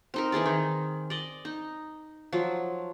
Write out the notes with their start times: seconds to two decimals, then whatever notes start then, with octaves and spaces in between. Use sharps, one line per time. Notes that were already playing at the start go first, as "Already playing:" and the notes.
0.14 C4 D#4 A#4
0.32 E3 D#4 G#4 D5
0.46 D#3
1.10 D5 D#5
1.45 D#4
2.32 F3 F#3